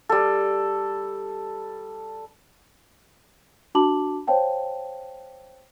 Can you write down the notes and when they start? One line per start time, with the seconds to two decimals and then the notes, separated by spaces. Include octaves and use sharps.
0.09 G3 A4
3.75 D4 F#4 A5 B5 D6 F#7
4.27 C5 C#5 F5 G5 A5